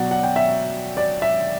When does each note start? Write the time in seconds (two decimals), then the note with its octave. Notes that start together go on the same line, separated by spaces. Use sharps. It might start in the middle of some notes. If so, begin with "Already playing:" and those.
Already playing: B2 F#3 D5 F#5
0.11 F#5
0.23 G5
0.36 E5
0.97 D5
1.22 E5